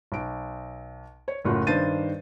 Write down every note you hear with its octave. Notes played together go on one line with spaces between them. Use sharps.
B1 D7
C#5
F#1 A2 F4 F#4
G2 D#3 D4 C5 A6 D#7